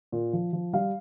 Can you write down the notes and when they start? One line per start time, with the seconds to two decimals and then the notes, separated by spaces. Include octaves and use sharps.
0.12 A#2
0.33 F3
0.53 F3
0.73 G3 F5